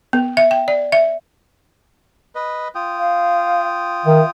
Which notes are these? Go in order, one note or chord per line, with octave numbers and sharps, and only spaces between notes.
B3
E5
G5
D5
E5
B4 D#5
F4 G5 D#6
F5
D#3 E5